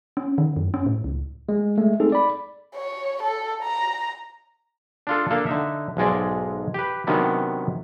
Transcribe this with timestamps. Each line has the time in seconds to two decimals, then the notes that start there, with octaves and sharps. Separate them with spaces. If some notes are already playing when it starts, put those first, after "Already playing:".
0.17 C#4
0.38 D#3
0.56 F#2
0.74 C#4
0.86 A2
1.04 C#2
1.49 G#3
1.78 G#3 A3
2.00 C4 D#4 G#4 A4
2.12 D5 B5
2.75 C#5
3.23 A4
3.63 A#5
5.07 D4 F4 A4
5.30 A#3 D4 A4 F5
5.46 D3 D#4 E5
5.97 B1 G#2 G#3 D5
6.74 G4 B4
7.07 C3 D#3 F#3 B3 C#4 D4